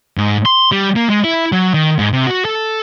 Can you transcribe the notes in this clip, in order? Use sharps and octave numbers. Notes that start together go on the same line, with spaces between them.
G#2
C6
G3
A#3
G#3
E4
F#3
D#3
G#2
C3
F#4
A4